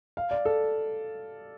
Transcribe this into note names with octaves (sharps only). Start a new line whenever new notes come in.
F5
D5
A4